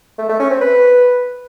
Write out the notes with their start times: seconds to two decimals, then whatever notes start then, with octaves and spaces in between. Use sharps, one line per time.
0.19 A3
0.29 A3
0.40 C#4
0.50 C4
0.61 B4